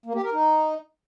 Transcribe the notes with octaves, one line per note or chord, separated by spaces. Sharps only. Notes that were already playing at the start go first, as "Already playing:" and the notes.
A#3
G4
A#4
D#4